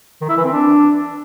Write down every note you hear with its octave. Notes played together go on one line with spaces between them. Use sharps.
D#3
E4
E3
C4
D4